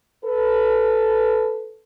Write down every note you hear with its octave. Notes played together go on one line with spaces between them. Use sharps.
A4 B4